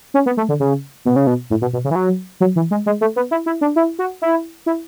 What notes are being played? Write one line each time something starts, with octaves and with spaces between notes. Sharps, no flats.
C#4
B3
A3
D3
C#3
B2
C#3
B2
A2
B2
B2
C#3
E3
F#3
F#3
E3
G#3
G#3
A3
B3
E4
E4
D4
E4
F#4
E4
E4